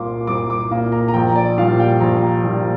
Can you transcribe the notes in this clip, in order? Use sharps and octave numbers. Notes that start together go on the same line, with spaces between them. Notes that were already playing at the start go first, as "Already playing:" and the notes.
Already playing: C2 A#2 A#3 C6 D6
C2 D6
D6
A#2 A#3
A#5
A#5
A#1 G5
D5
A#2 G3 F5
G5
A#1 A#5
A#2 G3